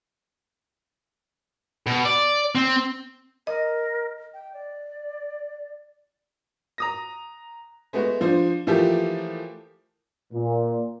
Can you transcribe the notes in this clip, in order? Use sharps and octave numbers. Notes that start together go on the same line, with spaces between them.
B2
D5
C4
A#4 D#5
G5
D5
A#5 D#6 A#6
G#3 A3 B3 F#4
F3 D4 C5
E3 F3 A3 A#3 G4 A4
A#2